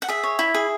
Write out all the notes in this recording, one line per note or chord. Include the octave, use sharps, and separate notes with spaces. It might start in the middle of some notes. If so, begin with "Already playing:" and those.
F#5
G#4 E5
C#5
E4
G#4